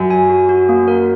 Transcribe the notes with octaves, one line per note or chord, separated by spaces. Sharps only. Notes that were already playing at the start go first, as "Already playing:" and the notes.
Already playing: F#2
G#5
F#4
F#4
A#3
A#4